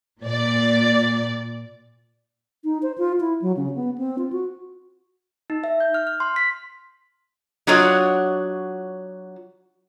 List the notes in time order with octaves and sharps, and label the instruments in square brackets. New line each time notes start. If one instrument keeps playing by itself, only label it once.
[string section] A#2 D5
[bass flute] D#4
C5
F4
E4
F#3
C#3
B3
C4
F4
F#4
[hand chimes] D#4
E5
G6
F6
F6
C6
B6
[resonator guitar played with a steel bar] F#3 D4 F4 F#4 C#5 D#5